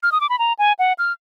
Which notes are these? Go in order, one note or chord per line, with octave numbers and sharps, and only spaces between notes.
F6
D#6
D6
B5
A#5
G#5
F#5
F6